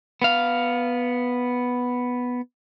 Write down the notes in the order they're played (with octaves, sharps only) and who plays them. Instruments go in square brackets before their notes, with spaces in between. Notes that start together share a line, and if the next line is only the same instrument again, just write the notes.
[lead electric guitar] B3 F5